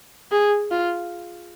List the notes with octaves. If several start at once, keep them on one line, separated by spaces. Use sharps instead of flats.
G#4
F4